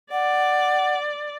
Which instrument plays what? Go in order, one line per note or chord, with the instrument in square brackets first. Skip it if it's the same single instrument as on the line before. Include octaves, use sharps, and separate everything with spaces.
[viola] D5 [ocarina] F#5